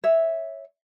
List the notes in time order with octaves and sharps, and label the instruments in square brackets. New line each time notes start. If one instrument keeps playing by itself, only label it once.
[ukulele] C#5 E5